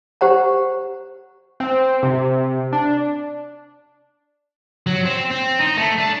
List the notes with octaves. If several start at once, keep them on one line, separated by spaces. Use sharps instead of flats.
G4 C5 F#5 A#5
C4
C3
D4
F#3
C4
C4
D#4
A3
D4